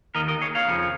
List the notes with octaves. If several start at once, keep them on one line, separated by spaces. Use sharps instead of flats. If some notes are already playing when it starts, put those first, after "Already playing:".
D#2 D#3 A#4 D#5
A#4 D#5
G#4 C#5
C#5 F5
F2 C#3 F3